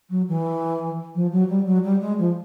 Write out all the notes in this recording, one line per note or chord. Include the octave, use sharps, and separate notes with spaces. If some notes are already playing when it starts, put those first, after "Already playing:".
F#3
E3
F3
F#3
G3
F#3
G3
G#3
F3